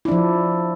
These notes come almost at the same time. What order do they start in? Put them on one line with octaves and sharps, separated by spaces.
E4 D4 F3